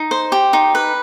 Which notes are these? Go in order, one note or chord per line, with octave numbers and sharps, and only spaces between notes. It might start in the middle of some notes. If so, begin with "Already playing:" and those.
Already playing: D#4
C5
G4
D#4
B4